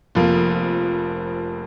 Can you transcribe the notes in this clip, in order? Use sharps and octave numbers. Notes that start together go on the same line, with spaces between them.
F1 F2 F3 A#3